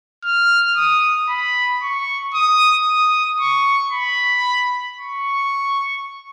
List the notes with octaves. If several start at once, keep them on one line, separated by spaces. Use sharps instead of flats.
F6
D#6
B5
C#6
D#6
D#6
C#6
B5
C#6